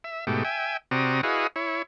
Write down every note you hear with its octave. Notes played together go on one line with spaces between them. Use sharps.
E5
G#2 B2 A3 G4
E5 G5 G#5
C3 C4 F#4 D5 A#5 D#6
E4 F#4 G#4 B4 D#5 F5
E4 C#5